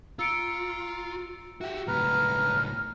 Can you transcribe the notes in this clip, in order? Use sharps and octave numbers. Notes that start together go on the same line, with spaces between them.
F4 A#5 E6 C#7 D7
F#4 G4 E5
C#2 A2 B4 A#5 F6